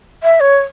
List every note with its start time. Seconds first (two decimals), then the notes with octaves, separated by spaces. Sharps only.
0.23 E5
0.40 C#5